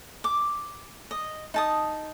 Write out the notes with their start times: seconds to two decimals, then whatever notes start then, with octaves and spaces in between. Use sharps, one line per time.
0.24 D6
1.11 D#5
1.54 D#4 A5 D#6